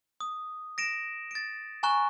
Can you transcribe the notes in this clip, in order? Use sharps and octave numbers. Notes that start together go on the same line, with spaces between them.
D#6
A#6 D7 E7
A6 D7
G#5 A#5 C#6 F#6